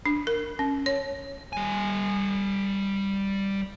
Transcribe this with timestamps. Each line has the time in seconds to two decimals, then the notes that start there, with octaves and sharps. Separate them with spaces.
0.06 D4
0.27 A#4
0.59 C#4
0.86 C#5
1.53 G3 G#5